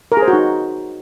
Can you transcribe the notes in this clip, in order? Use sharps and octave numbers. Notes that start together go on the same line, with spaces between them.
A#4
G#4
C5
F#4
D#4